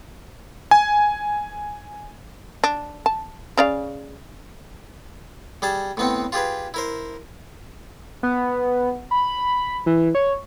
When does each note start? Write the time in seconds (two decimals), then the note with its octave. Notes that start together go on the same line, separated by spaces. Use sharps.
0.71 G#5
2.64 D4
3.06 A5
3.57 C#3 D5 F5
5.62 G3 G#4 A5
5.97 A2 B3 C4
6.32 F4 G4 G#4 B4
6.74 E4 A#4 C5
8.23 B3
9.11 B5
9.86 E3
10.15 C#5